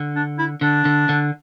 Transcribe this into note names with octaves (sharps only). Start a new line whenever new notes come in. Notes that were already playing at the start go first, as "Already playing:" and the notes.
Already playing: D3
D4
E4
D3 D4
D3
D3